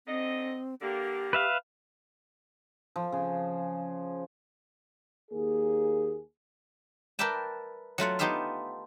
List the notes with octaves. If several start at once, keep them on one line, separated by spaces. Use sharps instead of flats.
D3 C4 D#4 D#5
D3 A#3 G4
B4 E5 F5
F3
C#3
D#2 A#3 G#4
A#4 B4 D5 E5 G5 A5
F#3 A3 F4 F#5
B3 D#4 F4 G4 E5 F5